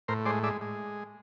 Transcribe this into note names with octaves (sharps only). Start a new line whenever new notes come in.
A2 A#4 C5
G#3 C5 D5
G#3 D5 E5
G#3